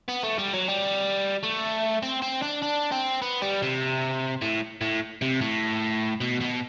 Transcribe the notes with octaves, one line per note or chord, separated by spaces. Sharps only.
B3
A3
G3
F#3
G3
A3
C4
C4
D4
D4
C4
B3
G3
C3
A2
A2
C3
A2
B2
B2